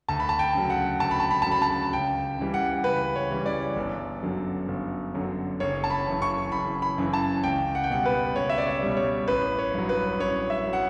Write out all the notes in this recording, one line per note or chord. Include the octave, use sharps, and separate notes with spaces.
D2 A5
B5
A5
G5
C#3 F#3
F#5
D2 A5
B5
A5
B5
C#3 F#3 A5
B5
A5
C#2 G5
C#3 E3 G3
F#5
C#2 B4
C#5
C#3 E3 G3
D5
G1
F#2 D3 F#3
G1
F#2 D3 F#3
F#1 C#5
A5
B5
F#2 C#3 E3
C#6
F#1 B5
B5
F#2 C#3 E3
A5
C#2 G5
F#5
G5
B2 G3 F#5
B4
C#2 C#5
E5
D5
C#5
B2 G3
C#5
A1 B4
C#5
G2 F#3
B4
A1 C#5
E5
F#3
F#5